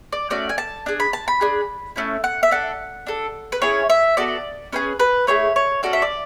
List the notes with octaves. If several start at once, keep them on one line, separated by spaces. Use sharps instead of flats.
D5
A3 C#4 F#4 D5
G#5
A5
D4 G#4
B5
A5
B5
D4 G#4
A3 C#4 E4
F#5
E5
D4 A4 F#5
D4 A4
B4
C#4 E4 G#4 C#5
E5
B3 F#4 A4 D5
C#4 E4 G#4 B4
B4
A3 E4 G#4 C#5
C#5
C#4 F#4 A4 D5
E5
D5